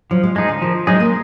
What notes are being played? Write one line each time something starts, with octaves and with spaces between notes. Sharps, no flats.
F3 F#3
G#3
F3 G#3 D#4 G#4
D3
D#3 F3
F#3 G#3 D#4 G#4
A#3